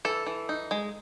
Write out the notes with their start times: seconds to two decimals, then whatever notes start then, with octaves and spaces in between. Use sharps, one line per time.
0.05 E3 A4
0.26 E3
0.49 D#4
0.71 G#3